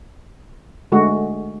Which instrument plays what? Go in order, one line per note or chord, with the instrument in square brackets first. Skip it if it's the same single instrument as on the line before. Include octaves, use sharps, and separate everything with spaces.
[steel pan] D3 G#3 A3 F#4